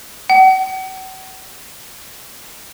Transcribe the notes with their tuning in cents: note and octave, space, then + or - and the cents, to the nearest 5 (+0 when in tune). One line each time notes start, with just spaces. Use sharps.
F#5 +40